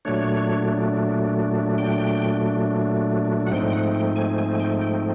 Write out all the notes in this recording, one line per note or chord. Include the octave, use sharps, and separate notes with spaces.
A#2 F#3 A3 D4 C#5
G5
F#5
G#2 F3 A3 C4 D#4 G5
G5
F#5
G5
G#5
G#5
G#5
G5
G5